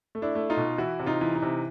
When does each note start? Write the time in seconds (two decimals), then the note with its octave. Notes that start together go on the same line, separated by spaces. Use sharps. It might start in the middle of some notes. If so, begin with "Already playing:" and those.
0.15 A3
0.22 D4 E4
0.35 A3
0.50 D#4 F4
0.57 B2
0.78 E3 E4 F#4
0.99 C3
1.06 D#4 F4
1.21 E3
1.35 D#4
1.42 C3